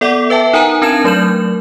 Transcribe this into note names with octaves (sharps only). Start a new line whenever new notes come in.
B3 A4 D5 F#5 D6
B4 E5 G5 A5
D#4 A#4 F#5 G#5 A#5
C4 D4 A#4 A5 G#6 E7
F#3 A3 A#4 G6 E7 F#7